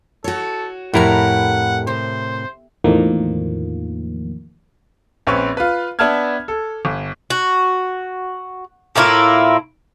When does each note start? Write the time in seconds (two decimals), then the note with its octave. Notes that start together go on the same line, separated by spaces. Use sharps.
0.24 F#4 A4 C#5
0.94 F2 A2 E4 G4 A#4 F#5 A#5
1.87 C3 C5
2.84 E2 A2 D#3 F3 A#3
5.27 A#1 C4 C#4 B4 C#6
5.57 F4 B4
5.99 B3 D4 E5 A5 F6 G#6
6.48 A4
6.85 G1
7.30 F#4
8.96 A2 A#3 E4 F4